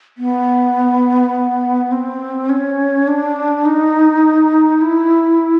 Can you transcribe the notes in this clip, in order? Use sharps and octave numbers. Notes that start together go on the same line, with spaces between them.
B3
C4
C#4
D4
D#4
E4